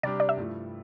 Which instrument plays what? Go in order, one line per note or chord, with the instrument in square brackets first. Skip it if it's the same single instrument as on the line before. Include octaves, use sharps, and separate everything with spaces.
[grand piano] C3 G3 D4 G4 [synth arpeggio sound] D5
[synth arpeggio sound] D5
E5
[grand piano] G2 F3 A3 E4